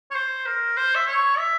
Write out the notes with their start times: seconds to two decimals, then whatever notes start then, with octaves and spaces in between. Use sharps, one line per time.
0.11 C#5
0.15 C5
0.46 A#4
0.77 C5
0.95 E5
1.07 C#5
1.38 E5